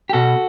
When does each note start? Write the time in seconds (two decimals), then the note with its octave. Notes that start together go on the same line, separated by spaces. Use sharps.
0.09 G4
0.13 B2 F#4 A4